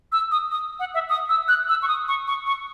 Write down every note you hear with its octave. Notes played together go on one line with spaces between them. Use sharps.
E6
D#6
D#6
F#5
E5
D#6
E6
F#6
E6
C#6
D#6
C#6
C#6
C#6